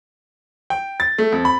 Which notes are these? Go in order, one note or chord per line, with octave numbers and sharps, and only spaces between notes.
G5
A6
A3
F2
B5